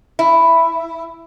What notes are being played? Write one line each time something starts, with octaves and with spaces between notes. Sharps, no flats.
E4